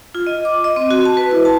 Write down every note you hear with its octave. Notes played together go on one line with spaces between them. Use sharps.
F4
D#5
D6
D#5
C4
F#4
A5
B4
E4
A5